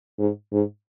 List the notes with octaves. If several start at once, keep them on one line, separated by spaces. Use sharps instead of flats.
G#2
G#2